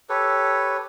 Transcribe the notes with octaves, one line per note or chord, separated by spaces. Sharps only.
G4 A4 B4 C#5